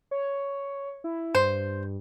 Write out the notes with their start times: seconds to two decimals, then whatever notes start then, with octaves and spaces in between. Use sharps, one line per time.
0.11 C#5
1.04 E4
1.35 G2 C5